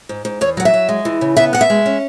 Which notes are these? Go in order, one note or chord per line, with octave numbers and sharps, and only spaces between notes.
G#2
G#2
E2 C#5
F#3 F#5
E5
F#3
G#3
E3
C#3
B3 E5
B2 F#5
E5
G#3
C#4